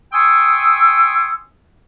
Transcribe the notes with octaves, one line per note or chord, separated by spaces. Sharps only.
G5 G#5 C6 C#6 D#6 E6